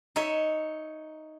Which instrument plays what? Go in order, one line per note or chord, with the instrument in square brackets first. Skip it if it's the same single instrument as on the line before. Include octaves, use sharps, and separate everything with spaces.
[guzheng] D#4 C#5 E5